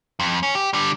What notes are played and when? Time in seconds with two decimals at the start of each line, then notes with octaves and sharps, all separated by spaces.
0.20 F2
0.43 C#4
0.55 G4
0.73 D3 G3